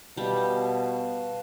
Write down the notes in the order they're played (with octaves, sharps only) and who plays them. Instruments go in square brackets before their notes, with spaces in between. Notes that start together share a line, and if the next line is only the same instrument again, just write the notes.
[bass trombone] B2 [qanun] G3 [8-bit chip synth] B4 F5 A5